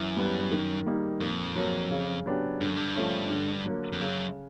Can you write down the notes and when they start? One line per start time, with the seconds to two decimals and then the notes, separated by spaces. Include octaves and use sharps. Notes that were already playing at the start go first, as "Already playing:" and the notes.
Already playing: F#2 E3
0.17 G3 B3
0.51 D#3
0.86 G3 A#3 D#4
1.21 F2 A#2
1.56 F#3 A#3
1.91 C#3
2.26 F#3 B3 D4 G4
2.61 G2 D3
2.69 F#2
2.76 G2
2.96 F3 A3 C#4
3.30 D3
3.65 F#3 A#3
3.92 F2
4.01 F#2 C#3